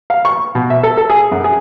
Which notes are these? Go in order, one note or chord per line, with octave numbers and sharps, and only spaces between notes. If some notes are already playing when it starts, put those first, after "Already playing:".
F5
C#6
B2
E5
A4
A4
G#4
F#2
G#4